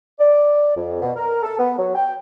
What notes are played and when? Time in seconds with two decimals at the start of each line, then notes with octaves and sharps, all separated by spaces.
0.20 D5
0.76 F2
1.02 B2
1.16 A#4
1.43 A4
1.58 B3
1.78 F#3
1.95 G5